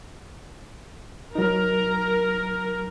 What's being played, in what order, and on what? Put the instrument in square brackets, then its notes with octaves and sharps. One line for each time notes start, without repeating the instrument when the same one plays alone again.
[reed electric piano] F#3 D#4 [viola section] A#4